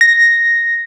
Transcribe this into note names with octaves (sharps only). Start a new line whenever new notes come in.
A#6